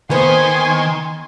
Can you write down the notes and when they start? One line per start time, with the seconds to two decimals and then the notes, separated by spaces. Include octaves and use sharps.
0.10 D#2 D#3 B3 C5 G#5 C6